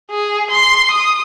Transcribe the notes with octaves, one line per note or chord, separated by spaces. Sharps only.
G#4
C6
D#6